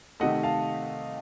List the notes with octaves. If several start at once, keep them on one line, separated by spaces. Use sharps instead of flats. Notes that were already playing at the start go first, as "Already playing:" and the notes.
C3 D#3 A3 D#5 F#5
F5 A5